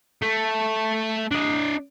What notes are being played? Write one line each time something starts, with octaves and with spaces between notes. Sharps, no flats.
A3
D4 D#5